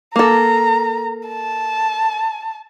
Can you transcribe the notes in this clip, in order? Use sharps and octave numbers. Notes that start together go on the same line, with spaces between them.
A#3 A4 A#5
A5